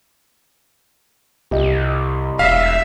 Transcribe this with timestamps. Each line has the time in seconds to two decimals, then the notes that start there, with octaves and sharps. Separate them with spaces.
1.51 C2 G4 D#5
2.39 E1 E5 F5